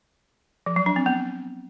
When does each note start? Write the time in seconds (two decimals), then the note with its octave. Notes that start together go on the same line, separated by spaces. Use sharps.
0.66 F3
0.76 F#3
0.86 D4
0.96 C4
1.06 B3